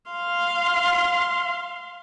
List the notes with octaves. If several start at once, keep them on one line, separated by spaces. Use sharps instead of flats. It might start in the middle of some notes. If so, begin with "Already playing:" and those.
F5 C6